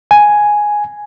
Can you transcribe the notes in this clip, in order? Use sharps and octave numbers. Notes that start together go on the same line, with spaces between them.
G#5